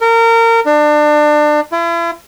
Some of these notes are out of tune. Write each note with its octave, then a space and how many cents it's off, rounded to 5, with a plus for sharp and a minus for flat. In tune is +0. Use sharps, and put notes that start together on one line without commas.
A#4 -25
D4 +30
E4 +40